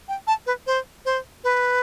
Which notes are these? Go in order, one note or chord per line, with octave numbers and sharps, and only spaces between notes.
G5
A5
B4
C5
C5
B4